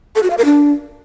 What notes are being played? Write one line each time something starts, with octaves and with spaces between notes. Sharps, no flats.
A4
F#4
F5
A#4
D4